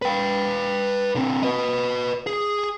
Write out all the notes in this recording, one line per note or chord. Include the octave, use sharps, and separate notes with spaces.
B4 G5
D3 C4
B4 D#5
G#4